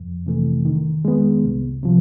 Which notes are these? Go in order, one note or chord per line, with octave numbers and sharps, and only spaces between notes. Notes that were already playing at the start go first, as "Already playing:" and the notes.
Already playing: F2
C3 E3 A3
D#3
G#3 B3
C2
C3 F3